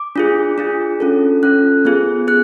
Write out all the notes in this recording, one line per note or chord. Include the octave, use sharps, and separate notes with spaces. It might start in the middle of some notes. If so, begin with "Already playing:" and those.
Already playing: D6
D4 F4 G#4
D4 F4 G#4
C#4 F4 A4
C#4 F4 A4 F#6
B3 F4 G#4
G#4 F#6